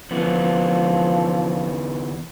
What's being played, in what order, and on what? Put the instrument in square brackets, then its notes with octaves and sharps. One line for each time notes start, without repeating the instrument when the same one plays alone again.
[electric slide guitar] E2 D3 B3 [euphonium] F3